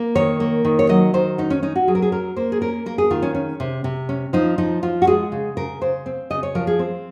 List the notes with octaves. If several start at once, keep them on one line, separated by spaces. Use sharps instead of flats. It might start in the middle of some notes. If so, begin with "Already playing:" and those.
Already playing: A#3
D#3 C#5
A#3
D#3
C#5
F#3 D#5
D#3 C5
C#4 D#4
C#4
C#4 D#4
F#4
F#3 G#4
A#4
G#4
C#4 A#4
A#3 C5
G#4
C#4 A#4
A#3 A#4
G#4
D#3 F4
C#4
C#4
C3
C3
C#4
F3 D#4
F3 D#4
F3 F4
F#4
G#3 G#4
C#3
C#3 A#4
C#3 C5
C4
C#3 D#5
C#5
F3 A#4
G#4
C4